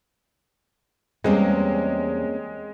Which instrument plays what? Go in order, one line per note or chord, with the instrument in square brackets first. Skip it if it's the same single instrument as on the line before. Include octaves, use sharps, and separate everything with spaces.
[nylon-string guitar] E2 G3 D#5 [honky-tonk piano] G#3 [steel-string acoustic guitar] A#3 C4 C#4